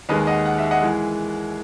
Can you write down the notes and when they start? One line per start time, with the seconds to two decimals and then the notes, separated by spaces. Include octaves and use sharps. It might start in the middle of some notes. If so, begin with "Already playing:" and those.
0.09 D#2 D#3 G#3 B4 D#5
0.27 D#5 F#5
0.46 F#5
0.58 E5
0.71 D#5 F#5
0.82 E3 G#3